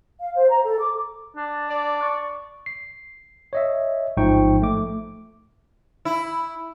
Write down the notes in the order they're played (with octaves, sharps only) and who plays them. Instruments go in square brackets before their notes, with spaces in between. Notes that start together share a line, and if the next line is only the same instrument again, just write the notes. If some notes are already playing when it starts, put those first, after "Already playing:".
[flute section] F5
C5
A#5
A4
D6
[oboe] D4
[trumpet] D5
[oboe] C#6
[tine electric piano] C7
C#5 D#5 E5
A1 G#2 F3 D#4 G5 C#6
A3 D6
[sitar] E4